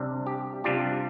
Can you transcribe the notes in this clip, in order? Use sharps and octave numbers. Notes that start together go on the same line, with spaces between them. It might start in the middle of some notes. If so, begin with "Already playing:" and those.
Already playing: C3 G3 D4
G4
C3 G3 D4 F4 G4